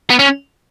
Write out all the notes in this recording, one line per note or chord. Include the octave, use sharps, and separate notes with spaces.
B3
C#4